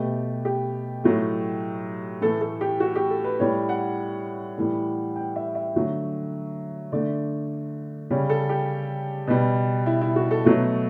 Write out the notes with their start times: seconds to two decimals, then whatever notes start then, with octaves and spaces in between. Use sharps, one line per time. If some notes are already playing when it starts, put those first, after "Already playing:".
Already playing: B2 A3 G4
0.45 G4
1.04 A2 F#3 A3
2.21 A2 E3 A3 A4
2.41 A4
2.61 G4
2.80 F#4
2.95 G4
3.10 A4
3.24 B4
3.40 A2 G3 C#5
3.69 F#5
4.58 A2 E3 G3
5.16 G5
5.36 E5
5.55 E5
5.75 D3 F#3 A3
6.92 D3 A3 D5
8.11 C#3 G3 C#5
8.30 A4
8.49 G4
9.27 B2 G3
9.86 E4
10.01 E4
10.16 F#4
10.31 A4
10.45 B2 F#3 A3 A4